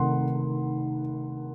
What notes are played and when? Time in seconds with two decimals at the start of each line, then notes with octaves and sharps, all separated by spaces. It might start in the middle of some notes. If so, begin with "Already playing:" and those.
Already playing: C3 D#3 A3 F#5 C6